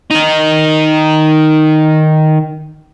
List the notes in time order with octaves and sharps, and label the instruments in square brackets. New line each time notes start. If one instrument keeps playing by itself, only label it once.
[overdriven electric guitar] D#3 D#4